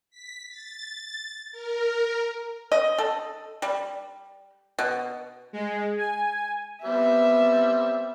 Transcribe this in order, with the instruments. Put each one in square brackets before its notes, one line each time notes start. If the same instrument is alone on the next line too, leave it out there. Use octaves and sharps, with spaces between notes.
[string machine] B6
A6
A#4
[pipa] D#5
A4
G3
B2
[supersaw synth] G#3
G#5
[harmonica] G3 C4 [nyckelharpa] B3 [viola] E5